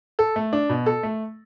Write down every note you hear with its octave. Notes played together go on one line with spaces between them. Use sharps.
A4
A3
D4
B2
A4
A3